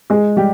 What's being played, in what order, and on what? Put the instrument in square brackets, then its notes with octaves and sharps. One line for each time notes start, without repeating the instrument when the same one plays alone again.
[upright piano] G#3 G#4
G3 G4